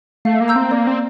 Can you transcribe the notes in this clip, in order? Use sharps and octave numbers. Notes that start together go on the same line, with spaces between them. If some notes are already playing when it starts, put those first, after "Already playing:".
A3 F5
A#3
A#5 E6 G6
C4
A#3 D5
C4